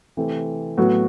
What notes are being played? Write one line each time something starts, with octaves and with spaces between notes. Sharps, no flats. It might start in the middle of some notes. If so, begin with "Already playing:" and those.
C3 E3 A3 C4
A2 F#3 B3 F#4